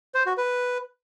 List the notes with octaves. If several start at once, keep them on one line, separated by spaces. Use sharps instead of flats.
C5
F#4
B4